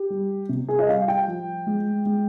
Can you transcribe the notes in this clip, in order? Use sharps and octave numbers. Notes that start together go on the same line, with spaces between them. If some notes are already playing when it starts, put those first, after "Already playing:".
Already playing: G4
G3
C3
G#4
D#5
G3 F5
G5
F3
G#3
G#3